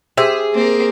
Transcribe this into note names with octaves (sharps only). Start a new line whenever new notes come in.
G4 G#4 C5 E5
A#3 C4 A#4